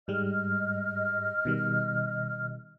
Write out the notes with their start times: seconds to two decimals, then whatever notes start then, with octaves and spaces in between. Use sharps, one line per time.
0.08 G#2 G3 G#3 D#5 F6
1.45 B2 D#3 G3